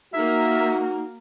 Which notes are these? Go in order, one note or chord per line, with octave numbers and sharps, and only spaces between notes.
A#3 D#4 F#4 A#4 E5